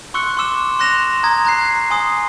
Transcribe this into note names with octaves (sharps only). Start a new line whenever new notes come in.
C6 C#6 E6 F#6 C#7
C6 D6 E6 E7
C6 F#6 A#6 E7 F7
A#5 D#6 G#6
A#5 F#6 C7
G#5 C6 D#6